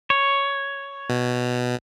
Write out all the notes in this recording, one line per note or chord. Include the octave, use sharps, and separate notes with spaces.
C#5
B2